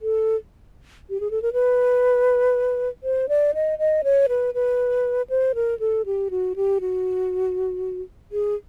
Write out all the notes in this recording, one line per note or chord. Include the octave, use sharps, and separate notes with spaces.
A4
G4
G#4
A4
A#4
B4
C5
D5
D#5
D#5
C#5
B4
B4
C5
A#4
A4
G4
F#4
G4
F#4
G#4